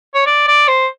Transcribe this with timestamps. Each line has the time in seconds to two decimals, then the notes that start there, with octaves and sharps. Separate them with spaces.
0.14 C#5
0.26 D5
0.47 D5
0.68 C5